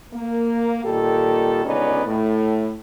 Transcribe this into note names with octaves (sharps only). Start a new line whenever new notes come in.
A#3
A#2 D#3 G3 G4 A4
C#2 D3 B3 C#4 D#4 D5
A2